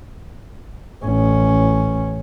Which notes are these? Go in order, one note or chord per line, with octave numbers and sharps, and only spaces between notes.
A1 C#4